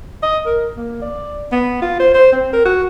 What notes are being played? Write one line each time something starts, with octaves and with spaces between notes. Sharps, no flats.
D#5
A#4
A#3
D5
B3
F4
C5
C5
C4
A#4
F#4